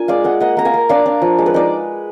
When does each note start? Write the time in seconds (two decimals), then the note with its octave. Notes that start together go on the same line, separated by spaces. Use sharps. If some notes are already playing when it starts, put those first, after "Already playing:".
Already playing: A#3 D4 F4 G#5
0.08 G#3 D5 F5
0.24 G#3 D#5 F#5
0.40 A#3 D#5 F#5
0.57 A#3 A#5
0.65 F5 G#5
0.74 A#3
0.89 D4 D5 F5
1.06 D4
1.22 F3
1.39 G#3
1.46 B4
1.54 D#4 D5